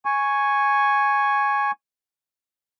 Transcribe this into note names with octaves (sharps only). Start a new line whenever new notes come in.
G#5 C#6